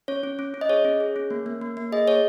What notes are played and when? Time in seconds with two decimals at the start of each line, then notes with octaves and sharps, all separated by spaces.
0.08 C#4 C#5
0.23 C#4
0.39 C#4
0.54 C#4
0.61 D#5
0.69 G#4 C#5
0.85 C#4
1.00 G#4
1.16 C#4
1.31 A#3
1.46 A#3
1.61 A#3
1.77 A#3
1.92 G#4 D#5
2.07 G#4 C#5